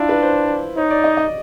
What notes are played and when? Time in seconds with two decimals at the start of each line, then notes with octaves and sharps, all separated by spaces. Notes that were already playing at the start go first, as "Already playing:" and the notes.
Already playing: D4 E4 F4
0.09 B4
0.22 C5
0.77 D#4 C#5
0.90 D5
1.04 D#5
1.17 D#5